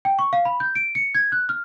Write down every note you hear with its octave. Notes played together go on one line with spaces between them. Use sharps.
G5
C#6
F5
B5
G6
D7
C#7
G#6
F#6
F6